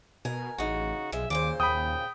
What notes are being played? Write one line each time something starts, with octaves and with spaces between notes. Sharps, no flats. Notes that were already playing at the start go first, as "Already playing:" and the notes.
B2 A#4 G#5
A1 C#3 D#4 F#4
B1 F3 G#3 E5
D#2 A#2 C#3 C5 D6
D#2 G5 B5 D#6